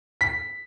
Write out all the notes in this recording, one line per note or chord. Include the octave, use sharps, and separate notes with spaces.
B6